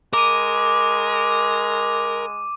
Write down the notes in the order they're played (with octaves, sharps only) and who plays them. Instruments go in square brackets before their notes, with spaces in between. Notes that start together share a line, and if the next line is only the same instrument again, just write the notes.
[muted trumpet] G#3 [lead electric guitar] A#4 [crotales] D6 D#7